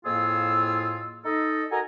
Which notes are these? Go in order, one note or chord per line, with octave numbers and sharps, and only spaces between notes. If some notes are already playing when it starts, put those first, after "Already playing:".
F2 A2 A#3 F4 G#4 E6
D#4 A4 D#5
F#4 A4 A#4 D#5 G#5 A#5